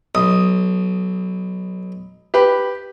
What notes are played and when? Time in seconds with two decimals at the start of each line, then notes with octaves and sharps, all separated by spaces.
0.15 B1 D#6
2.34 G4 B4